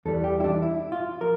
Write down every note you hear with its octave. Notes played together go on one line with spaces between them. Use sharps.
E2 E3 G3 A4
G4
E4
D4
E4
F4
F3 A#4